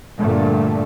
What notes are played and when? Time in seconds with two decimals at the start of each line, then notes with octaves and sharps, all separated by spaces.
0.18 G2 A#2 D3 A3